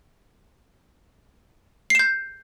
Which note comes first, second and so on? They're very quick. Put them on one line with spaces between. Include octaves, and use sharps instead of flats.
C7 E7 G6